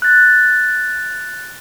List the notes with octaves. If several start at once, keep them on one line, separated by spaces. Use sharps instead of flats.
F#6 A6